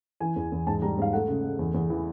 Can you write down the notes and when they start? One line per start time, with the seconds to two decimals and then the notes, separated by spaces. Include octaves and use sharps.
0.20 E3 G#5
0.36 E2
0.52 E2
0.67 G#2 A5
0.82 G3 A#5
0.98 G#2 F5
1.13 A3 F#5
1.28 C#3
1.44 A3
1.59 E2
1.74 E2
1.90 E3